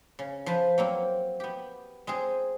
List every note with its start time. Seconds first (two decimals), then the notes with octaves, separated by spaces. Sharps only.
0.19 C#3
0.46 F3 B4 C5
0.78 F#3 A#3 C4
1.40 B3 G4
2.07 G#3 C4 G#4